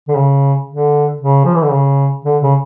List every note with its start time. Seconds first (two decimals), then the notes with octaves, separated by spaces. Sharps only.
0.09 D3
0.17 C#3
0.70 D3
1.21 C#3
1.45 F3
1.55 E3
1.63 D3
1.72 C#3
2.25 D3
2.43 C#3